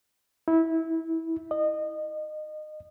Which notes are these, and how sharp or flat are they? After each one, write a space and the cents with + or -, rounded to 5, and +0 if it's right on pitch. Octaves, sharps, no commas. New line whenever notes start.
E4 -20
D#5 -25